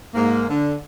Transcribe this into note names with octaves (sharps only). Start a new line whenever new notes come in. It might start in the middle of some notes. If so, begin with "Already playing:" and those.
G#2 A#3
D3